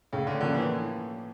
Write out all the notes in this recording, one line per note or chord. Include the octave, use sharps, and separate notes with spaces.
A2 C#3
D3
D3 F3 A#3 C#4
E3